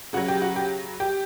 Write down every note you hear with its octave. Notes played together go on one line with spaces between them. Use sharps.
C#3 F#3 F#4
G4
F#4
G4
G4